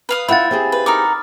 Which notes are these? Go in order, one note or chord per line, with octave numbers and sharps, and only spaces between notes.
B4 F5 D#6
E4 F4 E5 F#5 G5 B5 A6
C4 G4 G#4
B4
D#4 A#4 F#5 D6 D#6 F6